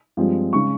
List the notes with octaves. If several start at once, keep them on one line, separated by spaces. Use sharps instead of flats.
G2 F3 G#3 C4
C#3 G#3 C#6